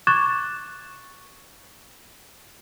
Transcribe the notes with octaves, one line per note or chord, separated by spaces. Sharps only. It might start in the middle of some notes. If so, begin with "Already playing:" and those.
C#6 D6 F#6 G#6 A6 E7